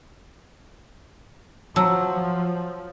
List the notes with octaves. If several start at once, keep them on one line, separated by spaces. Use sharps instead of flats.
F3 F#3 A5 E6